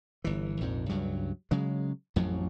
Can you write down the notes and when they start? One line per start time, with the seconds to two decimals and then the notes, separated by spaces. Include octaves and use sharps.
0.24 G1 E3
0.61 A#1 F2 G#2
0.89 C#2 G2 F#3
1.51 C#3 F#3 G#3
2.16 A1 F2 A2 F#3